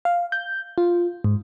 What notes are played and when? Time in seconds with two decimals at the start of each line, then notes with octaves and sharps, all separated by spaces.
0.05 F5
0.32 G6
0.78 F4
1.24 G#2